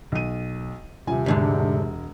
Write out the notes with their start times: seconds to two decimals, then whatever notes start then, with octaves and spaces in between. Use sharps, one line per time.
0.12 B1 D#7
1.07 D#1 C3 F3 G#5
1.26 E1 D2 G#2 D3 G#3